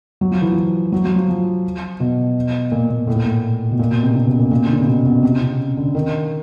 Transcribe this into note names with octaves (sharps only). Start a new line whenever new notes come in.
F#3
F3
E3
F3
F#3
F#3
F3
F3
B2
A#2
A#2
A2
A#2
A2
B2
A#2
B2
C3
C#3
B2
A#2
A#2
D3
C#3
C3
B2
B2
C3
C#3
D3
D#3